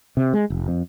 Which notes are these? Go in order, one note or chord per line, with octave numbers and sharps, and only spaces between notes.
C3
G#3
F1
F2